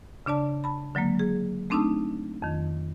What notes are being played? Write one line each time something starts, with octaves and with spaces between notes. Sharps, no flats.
C#3 D4 D5 A5
A5 B5
D3 F#3 G#3 A#3
G#4
A3 C4 D4 D#4 A5 E6
F2 D#3